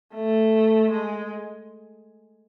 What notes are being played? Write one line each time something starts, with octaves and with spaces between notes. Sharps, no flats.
A3
G#3